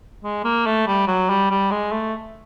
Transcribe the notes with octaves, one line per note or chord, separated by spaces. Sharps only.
G#3
A#3
A3
G3
F#3
G3
G3
G#3
A3